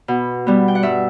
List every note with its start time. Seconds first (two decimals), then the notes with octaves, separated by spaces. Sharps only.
0.08 B2
0.47 G3 B3
0.68 G5
0.75 F#5
0.83 G2 E5